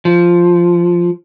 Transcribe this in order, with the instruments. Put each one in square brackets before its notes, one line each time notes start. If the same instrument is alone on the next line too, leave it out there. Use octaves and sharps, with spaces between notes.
[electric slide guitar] F3